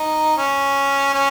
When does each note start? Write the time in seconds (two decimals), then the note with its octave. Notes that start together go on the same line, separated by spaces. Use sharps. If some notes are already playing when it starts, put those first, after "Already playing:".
Already playing: D#4
0.37 C#4
1.14 C#4